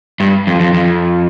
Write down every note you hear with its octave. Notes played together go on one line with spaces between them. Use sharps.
G2
F2
F2
F2